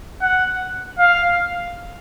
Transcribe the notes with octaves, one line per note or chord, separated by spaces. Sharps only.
F#5
F5